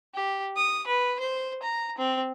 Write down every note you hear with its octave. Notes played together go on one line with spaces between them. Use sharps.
G4
D#6
B4
C5
A#5
C4